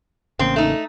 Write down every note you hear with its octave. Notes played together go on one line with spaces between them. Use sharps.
A1 C#3 A#3 C4
A3 D#4